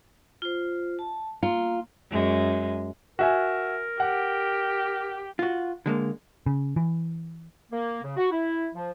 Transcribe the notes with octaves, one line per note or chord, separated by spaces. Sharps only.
F4 C5
A5
A#3 F4
F#2 G#3
F#4 A#4 E5 G#5
G4 F#5
F4 F#4
D3 G#3 A#3
C#3
E3
A#3
C#3
F#4
E4
F3